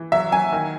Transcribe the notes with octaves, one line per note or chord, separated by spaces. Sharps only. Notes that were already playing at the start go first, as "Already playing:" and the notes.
Already playing: E3
F#3 E5
F#3 G#5
D#3